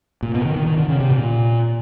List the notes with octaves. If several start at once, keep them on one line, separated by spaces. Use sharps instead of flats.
A#2
B2
D#3
D#3
D#3
D3
C#3
C3
A#2